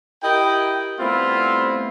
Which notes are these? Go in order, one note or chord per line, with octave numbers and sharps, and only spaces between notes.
E4 G4 A#4 D#5 G5
G3 A3 B3 C4 E4 F4